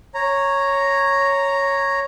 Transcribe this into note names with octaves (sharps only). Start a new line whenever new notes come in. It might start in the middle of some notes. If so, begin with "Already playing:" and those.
C#5 A#5